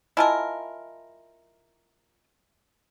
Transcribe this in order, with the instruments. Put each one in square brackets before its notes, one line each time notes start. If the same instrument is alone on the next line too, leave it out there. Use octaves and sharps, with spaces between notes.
[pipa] E4 F4 A#4 [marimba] D#5 G#5 A5